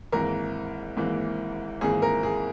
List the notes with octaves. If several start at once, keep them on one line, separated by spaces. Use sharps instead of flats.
G#1 G#2 E3 A#3 A#4
G#1 G#2 E3 A#3
G#1 G#2 E3 A#3 G#4
A#4
G#4